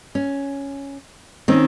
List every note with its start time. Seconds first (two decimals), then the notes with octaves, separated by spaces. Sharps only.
0.15 C#4
1.48 D#3 C4 C#4